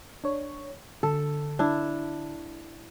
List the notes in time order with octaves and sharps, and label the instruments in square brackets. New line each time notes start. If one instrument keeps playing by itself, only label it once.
[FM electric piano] D4 C#5
[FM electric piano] D3 [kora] A4
[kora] D4 E4